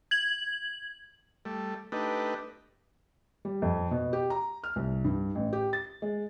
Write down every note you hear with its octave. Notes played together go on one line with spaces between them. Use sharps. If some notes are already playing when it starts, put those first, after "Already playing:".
G#6 F#7
G3 A3
A3 D4 D#4 G4 B4
G3
F2
B2
G4
A#5
F6
C2
G2
A1
G4
A6
G#3